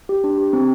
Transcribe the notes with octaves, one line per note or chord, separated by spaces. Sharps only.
G4
D4
G4
C4